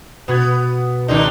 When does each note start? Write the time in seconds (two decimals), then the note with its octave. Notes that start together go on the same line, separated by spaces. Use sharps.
0.28 B2 B3 F#4 G#6
1.08 C#2 D#3 C4 D4 D#4 C#7